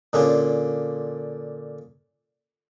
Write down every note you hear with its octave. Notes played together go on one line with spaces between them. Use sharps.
A#2 D3 C#4 D4 F4 G#4